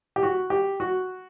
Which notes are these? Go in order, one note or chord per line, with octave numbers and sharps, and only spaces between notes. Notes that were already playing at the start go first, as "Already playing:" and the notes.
G4
F#4
G4
F#4